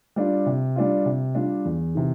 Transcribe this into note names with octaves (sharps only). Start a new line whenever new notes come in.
G3 D4 F4
C3
G3 D4 F4
C3
G3 D4 F4
E2
C3 E3